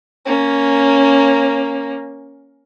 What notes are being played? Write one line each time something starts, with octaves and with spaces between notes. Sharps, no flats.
A#3 C#4